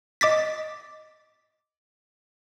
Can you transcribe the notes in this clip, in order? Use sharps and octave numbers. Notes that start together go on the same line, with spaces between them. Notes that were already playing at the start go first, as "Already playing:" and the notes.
D#5 D6 A6 B6